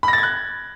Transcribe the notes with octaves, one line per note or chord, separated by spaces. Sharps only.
B5
A#6
A6
G#6
F#6